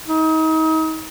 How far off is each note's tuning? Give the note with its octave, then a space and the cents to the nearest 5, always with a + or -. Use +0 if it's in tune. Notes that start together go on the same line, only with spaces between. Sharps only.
D#4 +35